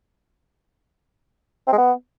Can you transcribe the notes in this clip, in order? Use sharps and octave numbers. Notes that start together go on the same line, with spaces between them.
C4
G#3
B3